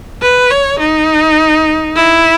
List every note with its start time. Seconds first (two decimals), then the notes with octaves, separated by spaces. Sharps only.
0.22 B4
0.51 C#5
0.79 D#4
1.96 E4